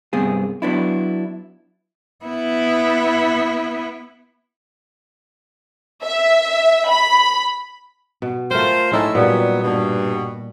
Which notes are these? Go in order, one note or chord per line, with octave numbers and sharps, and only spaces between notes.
C2 G2 B3 C4 G#4
F#3 B3 D4 E4
B3 E4
E5
B5
B2
A3 F4 A#4 C5 G5
A2 G#3 C#4 D#4 E4 A4
A#2 F#3 G3 B3
G2 B2